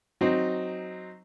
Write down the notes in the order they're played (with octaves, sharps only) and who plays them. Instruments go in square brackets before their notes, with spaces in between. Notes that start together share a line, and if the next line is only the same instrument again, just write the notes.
[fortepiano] F#3 C4 D#4